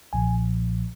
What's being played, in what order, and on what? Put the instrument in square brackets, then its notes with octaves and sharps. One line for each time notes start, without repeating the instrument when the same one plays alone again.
[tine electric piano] B1 A#2 F3 G#5